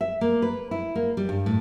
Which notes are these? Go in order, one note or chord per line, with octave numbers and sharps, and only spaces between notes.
E5
A#3
B4
E4
A#3
G3
G2
A2